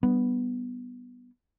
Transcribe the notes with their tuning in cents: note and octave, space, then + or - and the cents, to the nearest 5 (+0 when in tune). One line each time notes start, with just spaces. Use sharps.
G3 -15 B3 +0 D4 +30